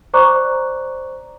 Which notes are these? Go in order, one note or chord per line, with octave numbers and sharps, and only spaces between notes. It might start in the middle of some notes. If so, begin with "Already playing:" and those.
C5 D5 A#5 C#6 D6 F#6